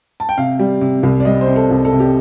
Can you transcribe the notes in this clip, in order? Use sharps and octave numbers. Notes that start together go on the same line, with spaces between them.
A5
G5
C3 F5
G3
C3
C2
D5
G3 D#5
C5
C3
A4
C2
A4
C3
G4